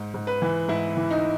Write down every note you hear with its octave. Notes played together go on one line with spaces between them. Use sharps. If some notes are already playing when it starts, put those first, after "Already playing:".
Already playing: G#2
G#2
B4
E3
G#2 E4
E3
D#4